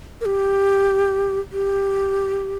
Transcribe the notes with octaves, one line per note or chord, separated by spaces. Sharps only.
A#4
G4
G4